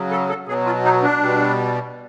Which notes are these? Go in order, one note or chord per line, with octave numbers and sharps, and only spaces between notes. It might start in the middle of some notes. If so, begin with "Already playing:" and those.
Already playing: C#3 F#3
A4
A4
B2 F#3 G#4
F4
D#4
D4
B2 G3